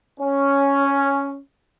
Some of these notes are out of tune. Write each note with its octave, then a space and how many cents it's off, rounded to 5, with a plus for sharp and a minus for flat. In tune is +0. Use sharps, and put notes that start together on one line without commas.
C#4 +0